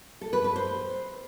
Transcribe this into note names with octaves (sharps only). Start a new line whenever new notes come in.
A4
B4
B4
C5